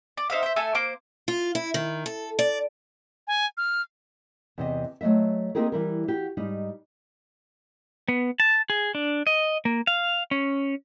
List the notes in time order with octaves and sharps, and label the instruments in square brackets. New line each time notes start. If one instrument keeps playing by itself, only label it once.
[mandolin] D5
D#4 C5 E5 F5
C5 E5
A3 A4 E5 G#5
A#3 C5 D6
[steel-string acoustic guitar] F4
E4
D#3
A4
D5
[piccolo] G#5
F6
[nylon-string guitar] E2 C3 D#5
F#3 A3 A#3 D#5 E5
A#3 C4 D#4 G4 G#4 A#4
E3 G3 A#4
F#4 G4
G#2 G3 D#4
[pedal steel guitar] B3
A5
G#4
D4
D#5
A#3
F5
C#4